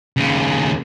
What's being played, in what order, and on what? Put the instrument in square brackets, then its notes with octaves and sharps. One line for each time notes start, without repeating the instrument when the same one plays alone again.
[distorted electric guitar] D#2 C#3